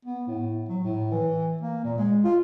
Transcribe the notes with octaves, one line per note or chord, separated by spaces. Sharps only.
B3
A2
F#3
A2
E3
A#3
A#2
G#3
F4